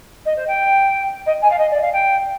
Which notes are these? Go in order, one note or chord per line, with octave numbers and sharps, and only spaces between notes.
D#5
C5
G5
D#5
G#5
F5
D#5
D5
F5
G5